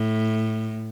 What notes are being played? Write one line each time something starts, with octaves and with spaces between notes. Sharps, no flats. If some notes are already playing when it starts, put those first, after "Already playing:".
Already playing: A2